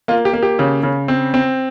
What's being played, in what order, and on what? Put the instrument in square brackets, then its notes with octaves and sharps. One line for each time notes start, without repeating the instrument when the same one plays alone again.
[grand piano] A#3 F4
G4
A#3
G4
C#3
C#3
C4
C4